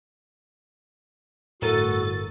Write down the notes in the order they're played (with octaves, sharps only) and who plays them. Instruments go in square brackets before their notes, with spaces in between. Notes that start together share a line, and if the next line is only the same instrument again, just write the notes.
[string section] G1 A6 [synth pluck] A2 A#4 D#7 [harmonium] F#4 [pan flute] A4